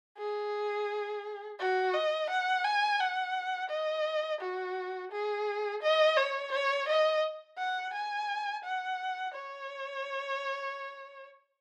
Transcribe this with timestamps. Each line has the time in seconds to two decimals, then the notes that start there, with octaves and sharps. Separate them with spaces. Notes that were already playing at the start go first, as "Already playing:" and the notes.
0.18 G#4
1.60 F#4
1.94 D#5
2.30 F#5
2.65 G#5
3.00 F#5
3.71 D#5
4.41 F#4
5.12 G#4
5.83 D#5
6.17 C#5
6.52 C#5
6.89 D#5
7.58 F#5
7.94 G#5
8.64 F#5
9.35 C#5